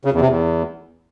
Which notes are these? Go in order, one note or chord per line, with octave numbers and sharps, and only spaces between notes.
C#3
E2
C3
E2